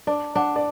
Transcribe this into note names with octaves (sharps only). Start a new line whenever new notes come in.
D4 D5
D4 F#5
D5